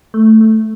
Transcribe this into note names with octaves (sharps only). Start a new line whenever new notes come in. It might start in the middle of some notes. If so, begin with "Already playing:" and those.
A3
A3